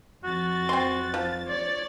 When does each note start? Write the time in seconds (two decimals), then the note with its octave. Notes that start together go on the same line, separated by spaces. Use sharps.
0.24 F2 F#4 A6
0.69 C4 C6
1.14 F3
1.48 C#5 D5 A6